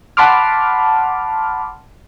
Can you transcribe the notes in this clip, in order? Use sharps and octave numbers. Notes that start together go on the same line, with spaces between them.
F#5 A5 B5 C6 D6 F6